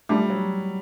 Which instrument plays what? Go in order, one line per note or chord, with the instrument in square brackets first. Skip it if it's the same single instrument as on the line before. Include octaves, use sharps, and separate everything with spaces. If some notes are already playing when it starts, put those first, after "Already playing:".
[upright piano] G3 [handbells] A3 D4 F4
[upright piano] F#3